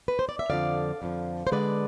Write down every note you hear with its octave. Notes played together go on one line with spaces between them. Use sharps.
B4
C5
D5
E5
F2 D3 F3 D5 F5
F2 D3 F3
C5
D3 G#3 B3 B4 D5